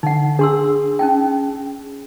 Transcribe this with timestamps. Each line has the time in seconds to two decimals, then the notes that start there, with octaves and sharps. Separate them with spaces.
0.03 D3 D#4 F#5
0.39 D4 G#4 C6 E6
0.99 C#4 D#4 G5